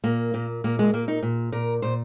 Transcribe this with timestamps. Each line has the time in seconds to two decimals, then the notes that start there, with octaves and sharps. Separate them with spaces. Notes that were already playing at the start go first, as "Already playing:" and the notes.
0.04 A#2 A#3
0.34 A#2
0.64 A#2 A#3
0.79 G#3
0.93 A#2 A#3
1.08 D#4
1.23 A#2
1.52 A#2 A#4
1.82 A#2 C5